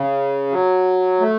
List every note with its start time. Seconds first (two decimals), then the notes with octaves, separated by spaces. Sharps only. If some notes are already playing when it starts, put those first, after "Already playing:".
Already playing: C#3
0.51 F#3
1.20 A3